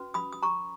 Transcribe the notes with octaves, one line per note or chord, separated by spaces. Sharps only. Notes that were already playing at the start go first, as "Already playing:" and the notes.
Already playing: C#4 F#4 B4
B5 D#6
D#6
A#5 C#6